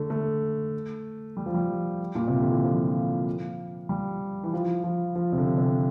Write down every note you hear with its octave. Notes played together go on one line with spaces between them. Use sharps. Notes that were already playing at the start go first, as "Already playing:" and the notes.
Already playing: D3 A3
A3
G3
F3
G3
A#2
C3
D3
E3
F3
G3
E3
F3
F3
F3
C3
D3
C3